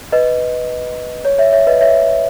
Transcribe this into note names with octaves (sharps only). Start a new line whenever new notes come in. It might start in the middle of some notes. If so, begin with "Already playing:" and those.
B4 D#5
C#5
C#5 E5
C#5 E5
B4 D#5
C#5 E5